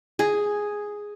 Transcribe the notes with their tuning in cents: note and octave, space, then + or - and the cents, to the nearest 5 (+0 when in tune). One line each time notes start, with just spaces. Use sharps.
G#4 +0